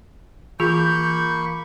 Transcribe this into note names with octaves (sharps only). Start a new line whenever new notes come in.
E3 A#3 F4 G#4 B5 C#6 G6